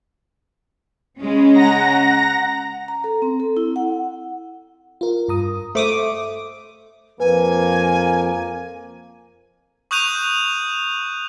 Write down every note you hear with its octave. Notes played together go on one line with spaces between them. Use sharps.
C#3 G#3 C#4
F#5 A#5 A#6
A#5
A4
C4
A4
E4
F#5
F4 A#4
G2 A#5 D#6
A3 C5 D6 D#6
F2 F3 A#3 B4 G#5
C#6 D#6 F#6 G6 D#7 F7